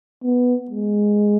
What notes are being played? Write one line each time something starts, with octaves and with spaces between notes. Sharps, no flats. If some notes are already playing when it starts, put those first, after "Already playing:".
B3
G#3